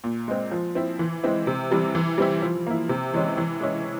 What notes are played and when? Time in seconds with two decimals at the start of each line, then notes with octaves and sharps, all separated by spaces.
0.04 A#2
0.28 G#3 C4
0.52 F3
0.75 C4 E4
0.99 E3
1.23 G#3 C4 E4
1.47 C3
1.71 E3 G3 C4
1.95 E3
2.18 G3 C4 E4
2.42 F3
2.67 A#3 E4
2.89 C3
3.14 E3 G#3 C#4
3.37 E3
3.61 G#3 C#4 E4